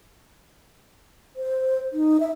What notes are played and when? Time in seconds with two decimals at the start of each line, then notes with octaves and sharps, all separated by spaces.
1.36 C5
1.93 D#4
2.20 E5